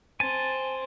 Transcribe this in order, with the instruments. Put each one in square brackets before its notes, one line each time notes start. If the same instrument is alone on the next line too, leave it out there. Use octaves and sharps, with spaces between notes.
[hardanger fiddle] C4 [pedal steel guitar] G#5 A5